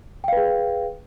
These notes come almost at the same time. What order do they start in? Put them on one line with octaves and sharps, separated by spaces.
G5 F5 B4 G#4